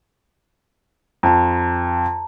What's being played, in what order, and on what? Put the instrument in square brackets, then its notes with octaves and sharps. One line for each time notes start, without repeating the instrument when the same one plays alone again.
[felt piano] F2 [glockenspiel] A5 A#5